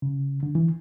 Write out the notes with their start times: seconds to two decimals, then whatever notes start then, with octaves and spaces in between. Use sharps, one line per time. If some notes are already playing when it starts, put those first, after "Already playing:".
0.02 C#3
0.43 D3
0.55 E3